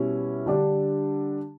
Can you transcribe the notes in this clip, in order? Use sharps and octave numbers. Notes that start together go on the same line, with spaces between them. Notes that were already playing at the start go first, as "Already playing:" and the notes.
Already playing: B2 G3 C#4 E4
D3 G3 D4